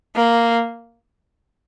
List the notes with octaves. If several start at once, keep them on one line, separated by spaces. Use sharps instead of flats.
A#3